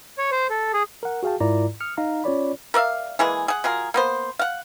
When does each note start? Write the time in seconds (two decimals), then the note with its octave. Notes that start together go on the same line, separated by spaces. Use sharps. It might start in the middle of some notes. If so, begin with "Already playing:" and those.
0.18 C#5
0.31 C5
0.50 A4
0.74 G#4
1.03 A#4 F#5
1.23 F#4 G#4 F5 G5 A5
1.40 G#2 E4 F4 A#4 D5 A#5
1.80 D#6 F6 C#7
1.97 D#4 F5 A#5
2.24 C#4 F4 C#5 D5 B5
2.74 A#4 D5 E5 F5
3.19 E3 G#3 A#3 G#4
3.48 G#4 F#5
3.64 F#3 F4 G#4 A#4
3.94 A#3 B3 C5
4.39 F5 F#5